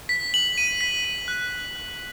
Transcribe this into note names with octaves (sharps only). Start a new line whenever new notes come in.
B6
F#7
D#7
B6
D#7
F#6
F#6
F#6